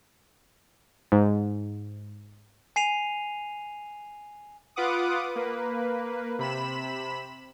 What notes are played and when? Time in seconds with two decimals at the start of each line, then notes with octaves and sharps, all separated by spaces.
1.12 G#2
2.76 G#5 C7 D#7 F7
4.76 F4 B4 F#5 D6 D#6
5.36 A#3 B4
6.39 C3 B5 E7